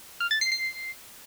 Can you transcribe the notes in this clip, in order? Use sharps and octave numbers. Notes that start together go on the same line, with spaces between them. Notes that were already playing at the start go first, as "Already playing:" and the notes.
F6
A6
C7
C7